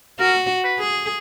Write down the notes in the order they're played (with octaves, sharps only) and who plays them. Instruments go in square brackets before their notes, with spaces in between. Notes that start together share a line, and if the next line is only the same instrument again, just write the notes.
[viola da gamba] F#4 [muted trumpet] A#4
[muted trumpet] B4
[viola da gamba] G#4